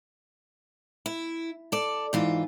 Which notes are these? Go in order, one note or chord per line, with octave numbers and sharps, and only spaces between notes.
E4
A4 D5
G#2 E3 F4